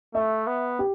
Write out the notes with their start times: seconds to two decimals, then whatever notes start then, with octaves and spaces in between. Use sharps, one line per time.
0.15 A3 E5
0.47 B3
0.79 G4